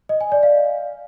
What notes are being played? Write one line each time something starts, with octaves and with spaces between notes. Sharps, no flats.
D#5
G#5
D5
F5